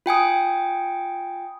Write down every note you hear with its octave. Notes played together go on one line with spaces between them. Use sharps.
F4 G5 G#5 D#6